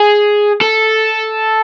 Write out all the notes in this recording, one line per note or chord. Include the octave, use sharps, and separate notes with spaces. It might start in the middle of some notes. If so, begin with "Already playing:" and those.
Already playing: G#4
A4